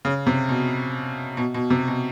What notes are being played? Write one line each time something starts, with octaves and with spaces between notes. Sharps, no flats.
C#3
C3
B2
B2
B2
C3
B2